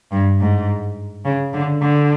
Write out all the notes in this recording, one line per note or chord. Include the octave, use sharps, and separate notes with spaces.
G2
G#2
C#3
D3
D3